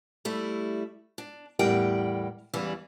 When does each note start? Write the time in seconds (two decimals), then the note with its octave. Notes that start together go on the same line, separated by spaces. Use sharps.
0.25 G3 A3 E4
1.18 D4
1.59 E2 A2 G3 A#4 F#5 G5
2.54 E2 C#3 E3 G3 D4